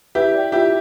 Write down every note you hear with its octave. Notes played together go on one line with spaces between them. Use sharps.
E4 G4 B4
D5 G5
E4 F4 G4